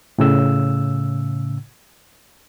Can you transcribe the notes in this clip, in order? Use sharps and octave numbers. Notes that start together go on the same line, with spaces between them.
A2 C#3 E6